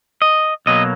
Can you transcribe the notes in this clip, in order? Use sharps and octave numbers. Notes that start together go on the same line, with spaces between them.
D#5
B1 B2 F#3 A#3 D#5